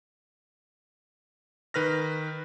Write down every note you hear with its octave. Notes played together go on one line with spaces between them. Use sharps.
D#3 B4 F6 A#6